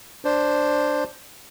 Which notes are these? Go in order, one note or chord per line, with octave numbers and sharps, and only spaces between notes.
D4 C5